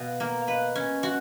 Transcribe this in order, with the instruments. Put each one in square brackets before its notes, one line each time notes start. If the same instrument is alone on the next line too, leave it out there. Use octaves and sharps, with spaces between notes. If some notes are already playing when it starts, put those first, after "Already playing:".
Already playing: [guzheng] B2 [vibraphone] F5
[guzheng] A#3
[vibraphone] F5
[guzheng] B4 [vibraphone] D#5
[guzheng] C#4
F#4